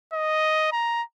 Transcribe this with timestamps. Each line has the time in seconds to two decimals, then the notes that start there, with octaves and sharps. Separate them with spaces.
0.13 D#5
0.72 A#5